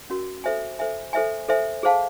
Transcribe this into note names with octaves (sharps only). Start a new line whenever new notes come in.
C#4 F#4 A#4
A4 C5 E5 G#5
A4 C5 E5 G#5
A4 C5 E5 G#5
A4 C5 E5 G#5
G#4 C5 F5 A5